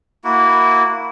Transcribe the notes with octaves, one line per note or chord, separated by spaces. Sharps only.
A#3 E4 F#4